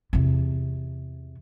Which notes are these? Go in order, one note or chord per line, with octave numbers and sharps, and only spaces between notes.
E2 C3